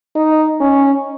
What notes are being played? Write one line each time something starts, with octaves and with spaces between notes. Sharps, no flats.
D#4
C#4